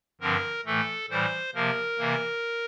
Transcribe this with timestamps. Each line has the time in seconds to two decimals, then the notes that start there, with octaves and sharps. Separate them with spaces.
0.21 G2 D3 F3 C4 A#4
0.65 A2 E3 A3 A4
1.10 A2 E3 G3 C5
1.55 C3 F3 A#3 A#4
1.99 C3 E3 A#3